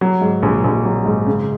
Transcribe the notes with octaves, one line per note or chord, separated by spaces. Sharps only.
F#3
G#2
A#1
A#1
F#3
G#2
C#3